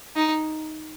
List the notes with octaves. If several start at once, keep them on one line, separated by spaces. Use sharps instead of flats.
D#4